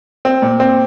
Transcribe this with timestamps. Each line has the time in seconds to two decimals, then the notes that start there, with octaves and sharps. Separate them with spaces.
0.25 C4
0.42 A#2
0.60 C4